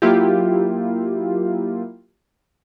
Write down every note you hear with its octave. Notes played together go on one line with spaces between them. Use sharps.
F#3 A#3 E4 F4 G4